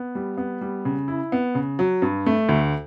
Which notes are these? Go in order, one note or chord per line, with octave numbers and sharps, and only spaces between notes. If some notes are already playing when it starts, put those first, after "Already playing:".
Already playing: B3
G3
B3
G3
C#3
E4
B3
C#3
F#3
G2
A3
D2